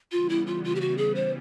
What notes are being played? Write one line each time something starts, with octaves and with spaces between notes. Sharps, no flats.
C#3 E3 G3 B3 F4
E4
F4
F4
G4
F#4
G#4
C5